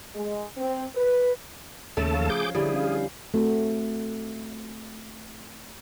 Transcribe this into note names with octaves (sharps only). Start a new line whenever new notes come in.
G#3
C4
B4
D#2 C#3 A3 C#4 A4 A5
F3 C#5 F5
G#4 D6 G6
D3 G3 D4 E4 G#4
C#4 F5
A3 C4 F#4